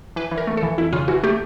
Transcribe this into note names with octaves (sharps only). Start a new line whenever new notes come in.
E3 B4
E3
A#4
A3
A4
E3
F2 E4
C#3 F4
E3 F#4
A3 G4